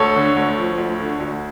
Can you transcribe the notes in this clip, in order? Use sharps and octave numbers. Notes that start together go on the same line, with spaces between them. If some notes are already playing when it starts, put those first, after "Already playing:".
Already playing: D2 A4 C#5
D3
D2
F3
D2
D3
D2